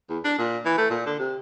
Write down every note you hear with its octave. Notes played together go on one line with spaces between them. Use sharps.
E2
D4
A#2
E3
A3
A#2
D3
C3